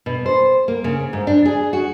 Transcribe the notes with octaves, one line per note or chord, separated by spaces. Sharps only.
B2
C5
A#3
C#3
G#2
D4
G#4
F#4